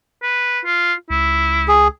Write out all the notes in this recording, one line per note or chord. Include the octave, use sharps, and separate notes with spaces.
B4
F4
C#2 E4
G#4